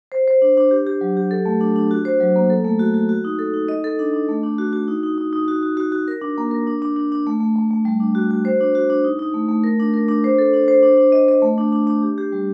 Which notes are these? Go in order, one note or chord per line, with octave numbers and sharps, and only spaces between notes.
C5
C5
D4
D4
G4
G4
F#3
G4
A4
A3
D4
D4
F#4
C5
F#3
A#3
A4
A3
F#4
F#4
F#4
D#4
A4
D#4
D#5
A4
D4
D4
A3
D4
F#4
F#4
D#4
D#4
D#4
D#4
F#4
F#4
F#4
F#4
A#4
D4
A#3
A#4
D4
D4
D4
D4
A3
A3
A3
A3
G3
D4
F#4
F#4
C5
D4
F#4
D4
D#4
D#4
A3
A3
A#4
D4
A#4
D4
C5
A4
D4
C5
D4
D4
D#5
D#5
A3
D4
D4
D4
G4
G4
G3